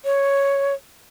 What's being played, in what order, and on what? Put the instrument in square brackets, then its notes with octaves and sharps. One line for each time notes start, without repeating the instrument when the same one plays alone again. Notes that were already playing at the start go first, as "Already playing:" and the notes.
[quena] C#5